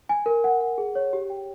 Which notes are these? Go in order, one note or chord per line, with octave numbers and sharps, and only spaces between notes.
G#5
A#4
F#5
F#5
G#4
C#5
G4
G5